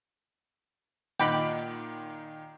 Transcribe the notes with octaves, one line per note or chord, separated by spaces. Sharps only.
A#2 D#3 D#5 F#5 G5 B5 D6 F#6